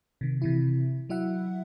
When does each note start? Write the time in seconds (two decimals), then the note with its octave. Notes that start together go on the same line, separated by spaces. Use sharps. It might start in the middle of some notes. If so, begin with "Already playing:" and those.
0.21 C3 D#3
0.42 C3 E3 E4
1.09 F#3 E4 E5 F#5